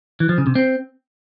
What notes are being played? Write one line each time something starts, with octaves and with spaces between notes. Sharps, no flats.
E3
F3
C#3
C3
C4